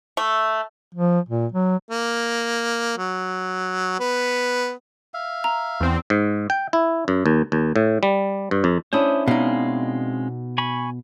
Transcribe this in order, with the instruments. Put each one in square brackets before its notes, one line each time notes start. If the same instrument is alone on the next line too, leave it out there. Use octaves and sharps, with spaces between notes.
[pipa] A3
[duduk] F3
A#2
F#3
[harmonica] A#3
F#3
B3
[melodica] E5 F5
[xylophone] A#5
[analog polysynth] E2 C4
[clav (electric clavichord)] G#2
G5
E4
F#2
D#2
D#2
A2
G3
G2
F2
[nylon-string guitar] C#4 D4 E4 [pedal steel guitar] C5 D#6
[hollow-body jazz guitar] B2 D#4 [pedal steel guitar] G#3 C4 F5
[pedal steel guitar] G#5 B5 C#6